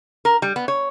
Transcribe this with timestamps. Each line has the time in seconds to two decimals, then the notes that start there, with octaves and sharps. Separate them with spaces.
0.25 A#4
0.42 G3
0.56 B3
0.68 C#5